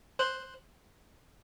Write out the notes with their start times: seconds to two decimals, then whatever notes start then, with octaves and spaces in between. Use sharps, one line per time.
0.19 C5 F#6